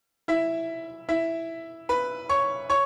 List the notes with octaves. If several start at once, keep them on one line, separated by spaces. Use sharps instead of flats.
E4 E5
E4 E5
B4 B5
C#5 C#6
C#5 C#6